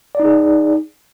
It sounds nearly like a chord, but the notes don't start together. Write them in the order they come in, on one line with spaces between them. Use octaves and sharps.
D5 D#4 G#4